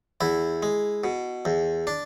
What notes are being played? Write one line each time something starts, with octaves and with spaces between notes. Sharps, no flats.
E2 E4
G#3
B2
E2
D4